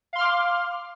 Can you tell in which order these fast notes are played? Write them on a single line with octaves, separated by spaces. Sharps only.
F5 C6 F6 D6